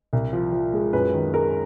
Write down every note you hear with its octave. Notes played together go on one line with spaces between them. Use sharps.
C2
F3
F3
G#3
F#2 B4
D#3
G#3 A#4